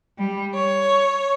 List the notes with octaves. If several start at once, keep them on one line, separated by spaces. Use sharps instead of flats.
G3
C#5